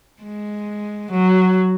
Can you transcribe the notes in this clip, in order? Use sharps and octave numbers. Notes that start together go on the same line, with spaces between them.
G#3
F#3